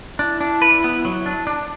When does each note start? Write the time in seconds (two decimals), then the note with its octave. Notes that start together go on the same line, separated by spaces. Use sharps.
0.19 D4 E4
0.41 D4
0.62 B4
0.84 B3
1.05 F#3
1.26 D4
1.47 D4